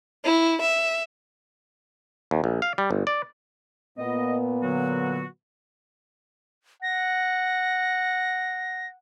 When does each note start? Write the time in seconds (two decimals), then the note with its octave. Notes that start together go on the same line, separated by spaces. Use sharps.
0.24 E4
0.61 E5
2.31 D#2
2.44 A#1
2.62 F5
2.78 G3
2.91 G1
3.07 D5
3.98 A#2 B3 D#5
4.62 D3 F#3 F#4
6.83 F#5 A#6